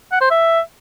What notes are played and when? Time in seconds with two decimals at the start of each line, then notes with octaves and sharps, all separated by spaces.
0.12 F#5
0.21 C5
0.31 E5